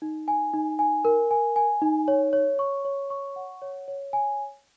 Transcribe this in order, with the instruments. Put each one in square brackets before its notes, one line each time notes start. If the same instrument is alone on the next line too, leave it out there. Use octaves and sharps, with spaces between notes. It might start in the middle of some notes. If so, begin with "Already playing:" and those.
[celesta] D#4
G#5
D#4
G#5
A#4
G#5
G#5
D#4
C#5
C#5
C#6
C#5
C#6
F#5
C#5
C#5
G#5